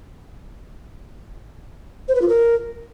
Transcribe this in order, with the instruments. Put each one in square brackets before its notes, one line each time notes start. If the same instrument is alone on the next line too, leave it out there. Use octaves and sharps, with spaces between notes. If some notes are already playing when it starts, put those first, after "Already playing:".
[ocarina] C5
B4
F4
A#4